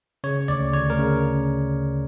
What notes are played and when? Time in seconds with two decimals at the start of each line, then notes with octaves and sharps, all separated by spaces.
0.24 C#3 C#5
0.48 D2 D5
0.73 D2 C#5
0.90 A#4
0.99 C#3